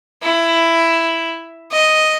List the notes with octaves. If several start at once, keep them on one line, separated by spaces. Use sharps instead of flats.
E4
D#5